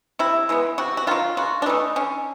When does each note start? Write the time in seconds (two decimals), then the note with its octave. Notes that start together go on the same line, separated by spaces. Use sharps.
0.19 C3 E4
0.49 E3 G#3 B3
0.78 C3 F#4
0.97 F#4
1.07 D#3 F#3 F4
1.37 C#3 F#4
1.62 D4
1.66 E3 A3 D#4
1.96 D3 C#4